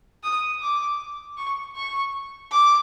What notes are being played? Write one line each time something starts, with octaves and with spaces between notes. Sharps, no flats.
D#6
D6
C#6
C#6
D6